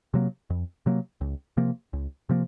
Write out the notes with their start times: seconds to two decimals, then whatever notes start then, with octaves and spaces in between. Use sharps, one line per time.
0.14 C3 F#3 A#3
0.50 F2
0.86 C3 F#3 A#3
1.21 C#2
1.57 C3 F3 A#3
1.93 C#2
2.29 C3 F3 A#3